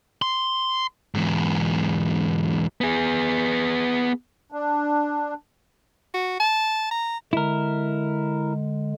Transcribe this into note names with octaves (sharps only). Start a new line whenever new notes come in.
C6
E2 G#2
B3 G#4
D4
F#4
A5
A#5
D3 G#3 E4 A#4